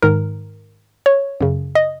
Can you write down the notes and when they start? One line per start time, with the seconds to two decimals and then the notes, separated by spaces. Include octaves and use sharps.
0.02 G#2 D#3 A#4
1.06 C#5
1.41 F#2 C#3
1.75 D#5